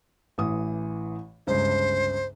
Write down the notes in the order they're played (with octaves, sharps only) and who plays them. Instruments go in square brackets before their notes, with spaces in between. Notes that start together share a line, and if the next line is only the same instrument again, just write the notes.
[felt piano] A1 E3 D#6
[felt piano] G1 C#2 [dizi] C5